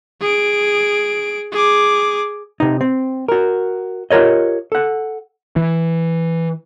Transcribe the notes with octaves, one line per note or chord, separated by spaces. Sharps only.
G#4 D7
G#4 D6
C3 D#4
C4
F#4 A#4
F4 G4 A#4 C#5 D#5
A4 F#5
E3